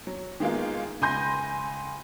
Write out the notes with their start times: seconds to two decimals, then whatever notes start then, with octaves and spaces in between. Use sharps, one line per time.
0.07 F#3
0.40 D#3 G#3 A#3 B3 F4
1.01 C#2 G#5 B5 C6 G6 A#6